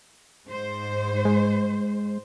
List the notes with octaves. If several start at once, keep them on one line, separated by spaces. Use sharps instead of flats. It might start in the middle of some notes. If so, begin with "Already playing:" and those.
G#2 C5
G#3